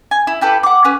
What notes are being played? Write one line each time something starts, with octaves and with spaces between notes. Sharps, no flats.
G#5
E4
E4 G4 A4 B4
F#5 D6
C#4 B4